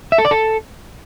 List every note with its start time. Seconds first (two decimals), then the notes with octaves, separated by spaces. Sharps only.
0.12 E5
0.18 A4
0.25 D5
0.31 A4